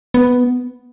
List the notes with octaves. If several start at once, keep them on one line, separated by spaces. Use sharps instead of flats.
B3